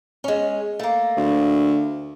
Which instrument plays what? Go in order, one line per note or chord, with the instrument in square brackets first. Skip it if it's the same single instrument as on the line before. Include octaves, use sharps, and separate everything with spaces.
[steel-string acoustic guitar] G#3 C#4
A3 A#3
[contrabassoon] D2